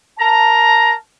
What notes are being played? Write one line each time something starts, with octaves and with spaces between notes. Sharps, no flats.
A#4 A5 A#5